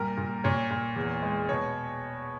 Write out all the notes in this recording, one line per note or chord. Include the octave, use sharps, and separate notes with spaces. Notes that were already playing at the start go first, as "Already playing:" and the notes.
Already playing: A#2 G3 A#4
A#2
A#2 C#5
A#2
E2
G#3
B2 C#5